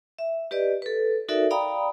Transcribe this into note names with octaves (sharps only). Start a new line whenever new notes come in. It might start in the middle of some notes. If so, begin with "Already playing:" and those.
E5
G4 B4 D5 D#5
A4 B4
D#4 F#4 A4 A#4 D5 E5
D5 F5 G5 A#5 B5 D#6